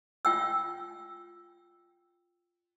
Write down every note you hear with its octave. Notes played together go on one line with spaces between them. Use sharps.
F4 G5 E6